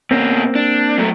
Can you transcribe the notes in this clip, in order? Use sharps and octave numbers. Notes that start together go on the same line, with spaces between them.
B2 A#3 C4 C#4
D4
F#3 A3